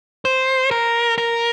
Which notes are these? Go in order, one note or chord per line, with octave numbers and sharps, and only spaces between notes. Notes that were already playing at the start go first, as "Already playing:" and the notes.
C5
A#4
A#4